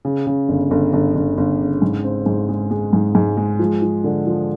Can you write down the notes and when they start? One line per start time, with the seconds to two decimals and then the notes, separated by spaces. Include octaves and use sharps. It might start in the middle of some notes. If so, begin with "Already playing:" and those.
0.05 C#3
0.27 C#3
0.49 G1
0.71 G1
0.93 G1
1.15 G1
1.37 G1
1.60 C#3
1.82 G#2
2.04 C4
2.26 G#2
2.49 G#3
2.71 G#3
2.93 G#2
3.15 G#2
3.37 G#3
3.59 F3
3.82 F3
4.04 D3
4.26 F3